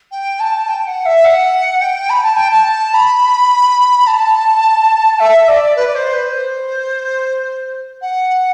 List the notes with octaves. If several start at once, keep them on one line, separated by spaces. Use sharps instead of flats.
G5
A5
G5
F#5
E5
F#5
G5
B5
A5
G5
A5
B5
A5
E5
D5
B4
D5
C5
B4
C5
F#5